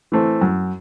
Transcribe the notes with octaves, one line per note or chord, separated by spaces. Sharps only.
E3 A3 C4
F#2